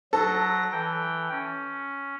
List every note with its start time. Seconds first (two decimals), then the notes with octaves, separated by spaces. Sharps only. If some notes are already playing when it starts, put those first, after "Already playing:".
0.13 F#3 A4 A#6
0.72 E3 G5
1.31 C#4